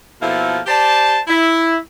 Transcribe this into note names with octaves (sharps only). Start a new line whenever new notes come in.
B2 F3 A#3 E4 A4
G4 C5 D5 A5
E4